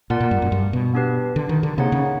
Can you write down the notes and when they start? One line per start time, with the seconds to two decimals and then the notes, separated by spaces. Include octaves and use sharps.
0.10 A#2 F4 A#4 D5 F#5 A5
0.20 A#2
0.31 G2
0.42 F#2
0.52 G2
0.73 B2
0.94 B3 D4 G4 B4
1.36 D3
1.49 D#3
1.63 D3
1.78 C3 A#3 D#4 G#4 C#5 F#5
1.92 C#3